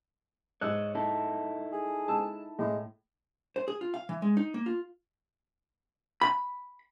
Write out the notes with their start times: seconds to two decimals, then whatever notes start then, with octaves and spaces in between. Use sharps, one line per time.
0.61 G#2 C#5 D#5 E6 F#6
0.95 D#4 E4 A4
1.73 G#4
2.08 G#3 A5 E6
2.59 A2 G#3
3.56 C5
3.68 G#4
3.81 F4
3.94 F5
4.09 E3
4.22 G#3
4.37 D#4
4.54 A#3
4.66 F4
6.22 B5